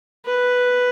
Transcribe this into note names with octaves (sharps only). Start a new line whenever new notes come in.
B4